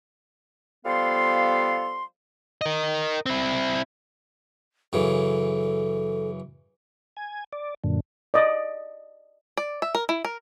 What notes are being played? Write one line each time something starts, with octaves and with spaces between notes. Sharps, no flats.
F3 G3 B3 A4 F5 C6
A#4 D#5
C4 E4
F#2 C#3 E3 A4
G#5
D5
F#2 A#2 D3
D5 D#5
D5
E5
A#4
E4
A#4